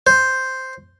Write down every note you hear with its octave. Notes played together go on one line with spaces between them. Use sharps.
C5